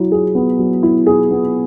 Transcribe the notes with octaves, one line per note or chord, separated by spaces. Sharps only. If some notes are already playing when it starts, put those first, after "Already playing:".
Already playing: F#3 E4
G#4
B3
F#3
E4
G#4
B3